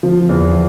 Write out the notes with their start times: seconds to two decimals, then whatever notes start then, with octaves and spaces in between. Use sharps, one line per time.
0.03 F3
0.29 E2